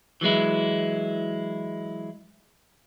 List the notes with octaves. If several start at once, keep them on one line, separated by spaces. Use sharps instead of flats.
E3 F#3 G#3 E4